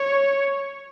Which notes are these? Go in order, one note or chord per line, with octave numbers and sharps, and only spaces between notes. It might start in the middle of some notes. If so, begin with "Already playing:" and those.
Already playing: C#5